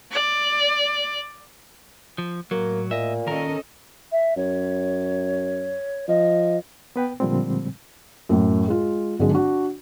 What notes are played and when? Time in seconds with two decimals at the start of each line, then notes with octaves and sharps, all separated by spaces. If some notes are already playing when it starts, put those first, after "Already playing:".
0.12 D5
2.18 F3
2.51 A2 F#3 A#3
2.91 A#2 D#5 E5
3.27 D#3 C#4 A4 A#4 D#5
4.12 E5
4.37 F#2 C#5
6.08 F3 D#5
6.96 B3 B4 G5
7.20 A#2 D3 F3 G3 G#3 C4
8.29 F#2 A2
8.68 G#3 F4
9.19 G#1 D3 F#3 G#3
9.31 D4 F#4